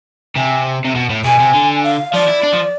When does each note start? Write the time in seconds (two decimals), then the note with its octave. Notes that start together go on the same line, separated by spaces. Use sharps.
0.36 C3 G#5
0.85 C3
0.96 B2
1.10 A2
1.25 B2 G#5
1.40 C3
1.54 D3
1.83 F5
2.13 F3 D5
2.28 E4
2.43 D4
2.53 F3